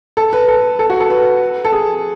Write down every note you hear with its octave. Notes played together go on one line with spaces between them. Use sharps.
A4
B4
A4
A4
F#4
A4
B4
A4
G#4